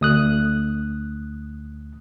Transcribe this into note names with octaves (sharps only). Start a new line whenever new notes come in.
D2 D#6 F#6